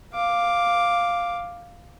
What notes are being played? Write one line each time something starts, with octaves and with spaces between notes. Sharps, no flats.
F5 D6